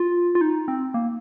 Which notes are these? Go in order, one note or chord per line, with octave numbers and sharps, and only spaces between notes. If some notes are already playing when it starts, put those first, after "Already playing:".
Already playing: F4
F4
D#4
C4
A#3